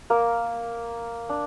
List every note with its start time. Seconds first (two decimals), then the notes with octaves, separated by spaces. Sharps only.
0.10 A#3 A#4
1.29 D4